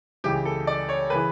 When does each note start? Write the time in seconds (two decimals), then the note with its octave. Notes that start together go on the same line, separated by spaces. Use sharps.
0.24 C#2 C#3 E3 G4
0.45 A4
0.67 D5
0.89 C#5
1.10 C#3 E3 B4